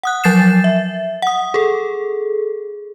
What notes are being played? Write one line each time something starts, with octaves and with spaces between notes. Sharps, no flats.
F#5 D#6 F#6
F3 F#3 G6 A6 C7 E7
E5
F#5 D#6
G#4 A4